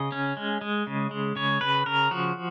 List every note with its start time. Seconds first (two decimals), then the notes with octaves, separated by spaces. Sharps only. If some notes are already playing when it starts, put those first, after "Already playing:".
Already playing: C#3 D#5
0.12 C#4
0.37 G#3
0.61 G#3
0.87 C#3
1.11 G#3
1.36 C#3 C#5
1.61 C#3 B4
1.86 C#3 A#4
2.11 F3 F#4